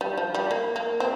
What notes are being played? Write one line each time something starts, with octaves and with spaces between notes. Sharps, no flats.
G3
F3
G3
A#3
A#3
C4